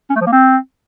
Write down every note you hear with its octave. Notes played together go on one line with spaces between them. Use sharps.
C#4
A3
F3
A#3
C4